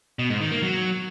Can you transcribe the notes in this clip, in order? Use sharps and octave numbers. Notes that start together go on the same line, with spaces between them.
B2
G#2
D#3
A#3
F#3